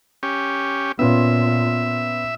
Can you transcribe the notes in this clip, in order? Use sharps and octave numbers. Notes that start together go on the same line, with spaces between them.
C#4 G4
A#2 B3 C#4 F4 E5